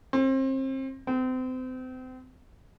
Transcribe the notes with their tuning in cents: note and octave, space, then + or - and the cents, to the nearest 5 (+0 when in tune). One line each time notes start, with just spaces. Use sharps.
C4 +30
C4 -35